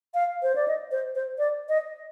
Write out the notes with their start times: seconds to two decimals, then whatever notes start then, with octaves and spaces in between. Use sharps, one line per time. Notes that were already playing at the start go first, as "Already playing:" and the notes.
0.14 F5
0.43 C5
0.55 D5
0.68 D#5
0.91 C5
1.15 C5
1.38 D5
1.69 D#5